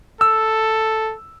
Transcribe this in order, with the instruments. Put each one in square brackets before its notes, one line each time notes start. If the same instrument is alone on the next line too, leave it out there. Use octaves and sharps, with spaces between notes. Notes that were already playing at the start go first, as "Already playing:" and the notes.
[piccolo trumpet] A4 [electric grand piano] E6